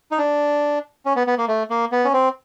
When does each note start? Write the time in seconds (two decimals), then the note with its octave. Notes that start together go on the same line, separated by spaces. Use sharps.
0.11 D#4
0.18 D4
1.06 C#4
1.16 B3
1.27 B3
1.38 A#3
1.48 A3
1.70 A#3
1.92 B3
2.05 C#4
2.14 C4